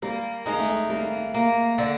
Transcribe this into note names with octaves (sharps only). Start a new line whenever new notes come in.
G3 A#3
G#3 D#4
A3
G#3
G3 A#3
A#3
D3